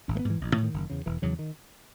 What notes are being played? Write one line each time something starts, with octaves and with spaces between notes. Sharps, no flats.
G#1 C#4
A3
B3
G#2
E3
A1
E3
A2
D#3
F#1
E2 C#3
E1 E3
E2 C#3 F#3
D#3